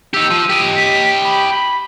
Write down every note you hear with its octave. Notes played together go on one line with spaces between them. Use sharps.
D#4 G4 E6
F3
G4 D#5
B6
B5
B5